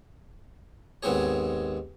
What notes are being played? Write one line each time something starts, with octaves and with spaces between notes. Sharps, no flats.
D#2 G#2 B3 C4 G#4 C#5